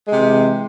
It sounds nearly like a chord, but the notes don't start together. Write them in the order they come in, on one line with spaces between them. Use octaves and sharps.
G#3 C3 E3